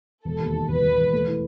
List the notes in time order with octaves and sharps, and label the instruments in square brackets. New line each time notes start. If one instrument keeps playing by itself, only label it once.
[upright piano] E1 [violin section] A4
[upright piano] D#2
D#3
[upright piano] E1 [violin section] B4
[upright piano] E1
E1
A3
E3